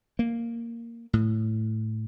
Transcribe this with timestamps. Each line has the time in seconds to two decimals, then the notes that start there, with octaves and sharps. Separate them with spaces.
0.19 A#3
1.13 A2